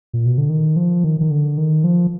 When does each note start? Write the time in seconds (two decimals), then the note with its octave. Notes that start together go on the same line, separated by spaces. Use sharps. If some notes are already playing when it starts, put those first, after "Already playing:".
0.13 A#2
0.26 B2
0.38 D3
0.49 D#3
0.76 F3
1.04 D#3
1.21 D#3
1.31 D3
1.58 D#3
1.84 F3